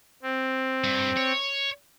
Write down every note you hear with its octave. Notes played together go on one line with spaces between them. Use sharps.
C4
G2
C#5